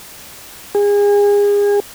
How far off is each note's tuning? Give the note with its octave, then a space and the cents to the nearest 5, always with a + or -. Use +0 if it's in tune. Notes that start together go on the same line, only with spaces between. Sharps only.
G#4 -30